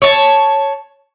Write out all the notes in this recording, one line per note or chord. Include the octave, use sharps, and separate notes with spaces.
C#5 A5